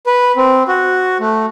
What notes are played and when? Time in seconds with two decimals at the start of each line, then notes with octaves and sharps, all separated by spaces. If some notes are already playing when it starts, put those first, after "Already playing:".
0.06 B4
0.36 C4
0.68 F#4
1.20 A3